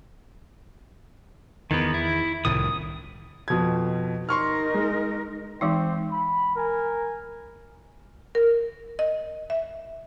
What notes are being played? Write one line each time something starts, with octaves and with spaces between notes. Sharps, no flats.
E2 D#3 B3
E4
C2 A2 D#3 D#6
F2 B2 G#6
D#4 A#4 C6 C#6 F6
G#3
E3 G#3 C4 D#4
B5
A#4 G#5
A#4
D#5
E5